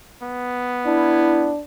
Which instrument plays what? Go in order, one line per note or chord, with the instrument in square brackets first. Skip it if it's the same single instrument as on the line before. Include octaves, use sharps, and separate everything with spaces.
[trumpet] B3
[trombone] D4 [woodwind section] E4